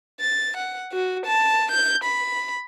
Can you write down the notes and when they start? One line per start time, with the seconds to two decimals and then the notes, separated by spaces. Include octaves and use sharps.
0.20 A6
0.57 F#5
0.92 F#4
1.26 A5
1.71 G6
2.04 B5